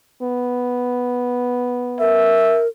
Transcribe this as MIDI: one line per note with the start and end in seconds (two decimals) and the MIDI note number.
0.22 2.38 59
2.00 2.67 70
2.00 2.62 76